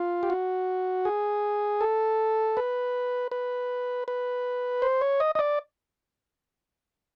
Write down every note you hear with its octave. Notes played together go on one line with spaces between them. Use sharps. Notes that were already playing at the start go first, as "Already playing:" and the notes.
Already playing: F4
G4
F#4
G#4
A4
B4
B4
B4
C5
C#5
D#5
D#5
D5